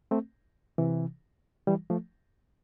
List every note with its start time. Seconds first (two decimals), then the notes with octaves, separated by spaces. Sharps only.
0.11 A3 C4
0.78 C3 E3
1.67 E3 G3
1.90 F3 A3